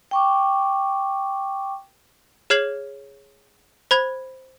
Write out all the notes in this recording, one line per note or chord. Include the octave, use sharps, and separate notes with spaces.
G5 C#6 D6
G#4 C#5 F6 G#6 C7 F#7
C5 B5 G#6